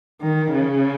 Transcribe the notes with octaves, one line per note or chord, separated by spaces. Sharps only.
D#3
C#3